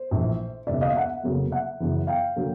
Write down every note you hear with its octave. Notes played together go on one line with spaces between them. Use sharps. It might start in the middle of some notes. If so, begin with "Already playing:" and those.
Already playing: C5
A#1 A2 E3
E1 D#2 C#3 D5 E5
D#5 F5
E5 F#5
F1 E2 C#3 F#3 A#3
E5 F#5
F#2 C#3 E3
F5 G5
D3 F#3 A#3